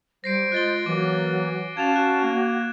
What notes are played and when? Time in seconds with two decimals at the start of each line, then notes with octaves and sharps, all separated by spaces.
0.24 G3 C5 A#6 C7 D7
0.52 G#3 F4 D#5 F#6 A6 G7
0.86 E3 F#3 A#3 D6
1.77 C#4 F#4 F5 A5 G#6 E7 F7
1.96 F#4 F#6
2.23 A#3